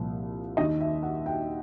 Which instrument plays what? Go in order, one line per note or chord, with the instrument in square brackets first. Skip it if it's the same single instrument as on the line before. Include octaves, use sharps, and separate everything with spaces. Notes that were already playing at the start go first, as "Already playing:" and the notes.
Already playing: [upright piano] C2 A#2 F3
D#2 D#3 D#5
E5
F#5
G5